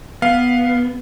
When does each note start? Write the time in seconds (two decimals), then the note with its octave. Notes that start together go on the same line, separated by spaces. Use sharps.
0.22 B3 F5